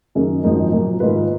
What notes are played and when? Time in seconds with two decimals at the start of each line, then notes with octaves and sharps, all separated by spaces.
0.15 F#2 D#3 A#3 C#4 G#4
0.44 G#1 G#2 F3 A#3 D#4
0.72 A#2 F#3 A#3
1.00 G#2 D#3 A#3 F4 B4